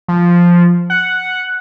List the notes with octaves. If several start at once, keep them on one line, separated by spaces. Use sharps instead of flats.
F3
F#5